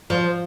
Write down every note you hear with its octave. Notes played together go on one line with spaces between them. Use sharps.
F3